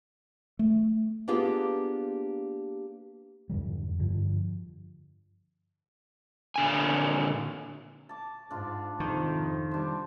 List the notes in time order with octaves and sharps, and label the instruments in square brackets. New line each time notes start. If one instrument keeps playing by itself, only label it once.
[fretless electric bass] A3
[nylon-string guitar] A#3 B3 D4 F4 G4 G#4
[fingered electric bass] F2 G#2 D3 G3
G2 D3 F3
[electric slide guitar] A#2 D3 G#5
[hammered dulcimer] A5 D6
[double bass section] G#2 [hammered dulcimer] D4 F4
[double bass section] F2 C3 [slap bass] D#3
[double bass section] G3 [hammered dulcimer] D4 C5